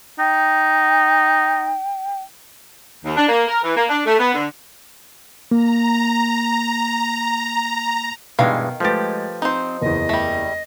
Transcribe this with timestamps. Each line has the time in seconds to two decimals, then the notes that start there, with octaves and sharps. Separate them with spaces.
0.19 D#4 G5
3.05 D#2
3.17 D4
3.29 A#3
3.48 A#4
3.63 E3
3.77 A#3
3.89 D4
4.06 A3
4.19 B3
4.34 D3
5.51 A#3 A#5
8.39 G2 B2 D#3 E3 G#3 F5
8.80 F3 G#3 A3 G4 B4 A6
9.42 C4 D#4 C5
9.82 F#1 E2 D#5
10.09 G3 A3